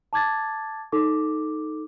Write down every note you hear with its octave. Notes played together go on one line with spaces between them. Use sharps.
A5 D6 G#6 A6
D#4 A4 D6